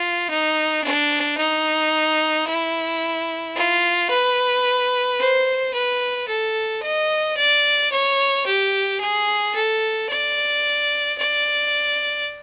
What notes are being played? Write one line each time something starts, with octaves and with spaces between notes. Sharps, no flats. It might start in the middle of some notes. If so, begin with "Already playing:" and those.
Already playing: F4
D#4
D4
D#4
E4
F4
B4
C5
B4
A4
D#5
D5
C#5
G4
G#4
A4
D5
D5